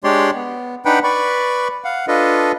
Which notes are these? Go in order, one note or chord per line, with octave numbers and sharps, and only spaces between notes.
G#3 D4 G4 C#5 D5 C6
B3
D4 D#4 B4 F#5 G5 B5
B4 D5 B5 C#6
F5 F#5
D4 F4 A4 B4 D#5